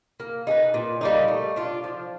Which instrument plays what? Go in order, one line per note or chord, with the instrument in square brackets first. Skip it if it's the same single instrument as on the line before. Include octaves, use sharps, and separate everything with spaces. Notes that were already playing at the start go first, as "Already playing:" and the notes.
[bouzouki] A#3
D#4 G#4 B4
A#2
G3 A#3 D#4
A3
D4 F4
F3